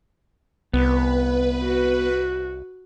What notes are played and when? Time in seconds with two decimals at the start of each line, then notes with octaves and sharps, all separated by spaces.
0.73 C2 B3 B4
1.64 F#4